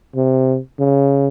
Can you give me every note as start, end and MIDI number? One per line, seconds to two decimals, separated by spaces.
0.15 0.58 48
0.79 1.28 49